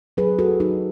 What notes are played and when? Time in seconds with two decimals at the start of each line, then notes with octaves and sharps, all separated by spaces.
0.17 F#3 G#4 B4
0.39 F#4 A4
0.60 F#3 D#4 F#4